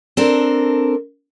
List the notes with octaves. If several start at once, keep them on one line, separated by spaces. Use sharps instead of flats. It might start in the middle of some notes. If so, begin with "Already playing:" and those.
C4 D4 A4 A#4